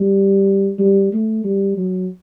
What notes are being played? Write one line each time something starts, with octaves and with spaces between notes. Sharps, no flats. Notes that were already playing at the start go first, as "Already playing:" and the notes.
Already playing: G3
G3
A3
G3
F#3